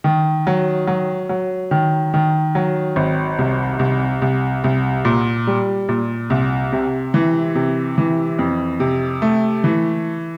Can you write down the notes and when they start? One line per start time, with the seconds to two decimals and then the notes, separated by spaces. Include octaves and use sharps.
0.04 D#3
0.47 F#3
0.87 F#3
1.29 F#3
1.71 D#3
2.14 D#3
2.55 F#3
2.96 G#1
3.39 C2
3.79 C2
4.22 C2
4.64 C2
5.05 A#2
5.47 G3
5.89 A#2
6.30 C2
6.73 C3
7.14 E3
7.55 C3
7.98 E3
8.39 F2
8.80 C3
9.22 A3
9.64 E3